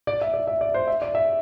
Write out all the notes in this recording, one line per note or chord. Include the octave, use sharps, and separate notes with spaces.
D5
E5
D5
E5
D5
C5
E5
D5
E5